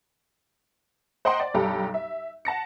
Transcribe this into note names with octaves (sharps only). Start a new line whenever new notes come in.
C5 D#5 F#5 G5 A#5 C6
D5
B1 G2 G4 A4 A#5 B5
E5
F#5 A5 A#6 C#7